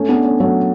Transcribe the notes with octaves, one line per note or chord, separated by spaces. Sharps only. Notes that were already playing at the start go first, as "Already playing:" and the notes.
Already playing: A3 C#4
B3 D4
A3 C#4
F#3 A3